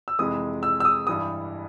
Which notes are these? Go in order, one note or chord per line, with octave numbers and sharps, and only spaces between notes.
E6
F2 C3 E3 G#3 D#6
E6
E6
D#6
G2 E3 G3 D#6